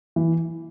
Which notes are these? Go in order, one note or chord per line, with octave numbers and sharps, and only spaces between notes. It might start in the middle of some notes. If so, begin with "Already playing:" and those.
E3